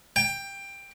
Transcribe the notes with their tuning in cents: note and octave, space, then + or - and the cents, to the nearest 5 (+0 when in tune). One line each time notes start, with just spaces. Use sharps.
G5 +15